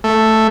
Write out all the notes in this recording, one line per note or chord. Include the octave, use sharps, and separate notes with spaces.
A3